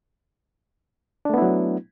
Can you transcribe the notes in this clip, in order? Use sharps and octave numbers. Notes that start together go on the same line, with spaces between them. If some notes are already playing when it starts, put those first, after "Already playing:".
F#3 A3 B3 D4 E4